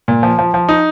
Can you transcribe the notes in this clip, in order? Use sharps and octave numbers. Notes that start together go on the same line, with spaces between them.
A#2
F3
F3
F3
D#4